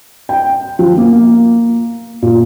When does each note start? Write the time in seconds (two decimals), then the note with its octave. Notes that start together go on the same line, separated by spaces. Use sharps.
0.29 G5
0.79 F3
0.98 A#3
2.22 A#2